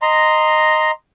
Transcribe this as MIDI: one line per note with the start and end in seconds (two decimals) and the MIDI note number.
0.02 0.91 75
0.02 0.91 82
0.02 0.91 84